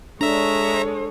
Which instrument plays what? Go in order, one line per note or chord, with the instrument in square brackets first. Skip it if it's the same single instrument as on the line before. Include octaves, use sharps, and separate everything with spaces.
[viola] G#3 C#5 [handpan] D4 [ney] A4 [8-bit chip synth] E5 A#5